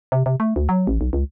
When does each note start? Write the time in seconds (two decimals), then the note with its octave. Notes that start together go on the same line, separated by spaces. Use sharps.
0.12 C3
0.26 C3
0.40 A3
0.56 D2
0.69 F#3
0.87 A1
1.01 B1
1.13 C#2